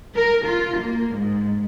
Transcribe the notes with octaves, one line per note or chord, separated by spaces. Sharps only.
A#4
F4
A#3
G#2